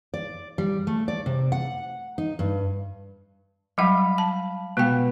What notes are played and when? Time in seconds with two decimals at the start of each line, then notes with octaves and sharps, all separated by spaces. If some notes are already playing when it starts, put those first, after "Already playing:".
0.14 D5
0.58 G3
0.87 A3
1.08 D5
1.26 C3
1.52 F#5
2.18 D#4
2.39 G2
3.78 F#3 G3 F5 F#5 B5
4.18 A5
4.77 B2 G#3 G5